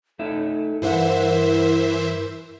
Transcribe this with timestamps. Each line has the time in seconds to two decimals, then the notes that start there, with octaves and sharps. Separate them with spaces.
0.19 A3 D#4 A4 E5
0.82 G2 E3 A#4 C5 E5 F#5